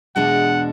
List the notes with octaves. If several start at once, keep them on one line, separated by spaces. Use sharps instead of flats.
E2 B2 G#3 D4 F#5